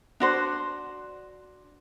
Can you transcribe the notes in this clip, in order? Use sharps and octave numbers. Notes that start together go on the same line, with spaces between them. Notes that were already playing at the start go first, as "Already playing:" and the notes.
D4 F#4 C5